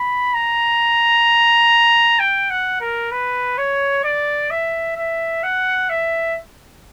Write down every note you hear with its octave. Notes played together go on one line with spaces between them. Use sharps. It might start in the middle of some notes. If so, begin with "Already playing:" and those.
Already playing: B5
A#5
G5
F#5
A#4
B4
C#5
D5
E5
E5
F#5
E5